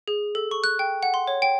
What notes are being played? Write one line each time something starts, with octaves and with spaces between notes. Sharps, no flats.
G#4
A4
C#6
F#6
G5
F#5
C6
C#5
G5